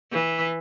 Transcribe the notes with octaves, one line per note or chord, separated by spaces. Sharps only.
E3